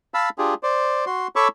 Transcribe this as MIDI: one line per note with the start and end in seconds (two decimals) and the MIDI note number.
0.14 0.29 77
0.14 0.29 81
0.14 0.29 83
0.14 0.29 88
0.38 0.54 62
0.38 0.54 65
0.38 0.54 67
0.38 0.54 68
0.63 1.05 72
0.63 1.05 74
1.06 1.27 66
1.06 1.27 84
1.36 1.48 69
1.36 1.48 73
1.36 1.48 83
1.36 1.48 85
1.36 1.48 86
1.36 1.48 88